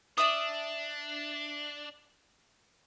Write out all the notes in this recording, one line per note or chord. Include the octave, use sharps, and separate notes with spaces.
D4 D5 E5 D#6